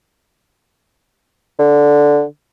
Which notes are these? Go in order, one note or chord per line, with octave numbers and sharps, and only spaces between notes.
D3